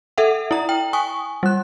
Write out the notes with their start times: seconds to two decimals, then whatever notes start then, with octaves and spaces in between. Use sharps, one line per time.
0.18 A4 E5 F#5
0.51 E4 A#5
0.69 G5
0.93 G#5 C#6 D#6
1.43 G3 F#6